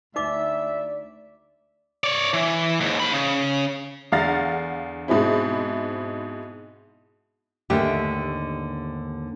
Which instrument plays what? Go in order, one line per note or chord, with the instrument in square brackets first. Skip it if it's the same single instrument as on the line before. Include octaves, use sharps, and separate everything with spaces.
[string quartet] D2 [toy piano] D#4 D6 [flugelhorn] D5 [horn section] E5
[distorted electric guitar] C#5 D5
E3
D#2 G#2
C5 B5
C#3
[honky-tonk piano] E2 D3 F5 F#5 A6 A#6
G#2 B2 C4 E4
[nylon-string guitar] D#2 G#2 D3 A3 D4 G4